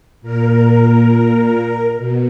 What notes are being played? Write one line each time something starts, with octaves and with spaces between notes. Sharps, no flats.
A#2 A#4
B2